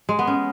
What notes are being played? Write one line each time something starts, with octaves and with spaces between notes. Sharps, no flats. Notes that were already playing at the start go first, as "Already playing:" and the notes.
G#3
B3
C#4